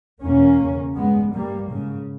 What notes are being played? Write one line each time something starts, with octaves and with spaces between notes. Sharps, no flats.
E2 B2 A#3 C#4
E2 C#3
G2 G#3 B3
G2 G3 A#3
G#2 C#3